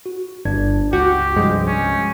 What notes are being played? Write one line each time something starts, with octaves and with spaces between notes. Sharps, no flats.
F#4
G1 D4 G#6
C#2 F#4 G4
C2 G2 F3 G#3
C#4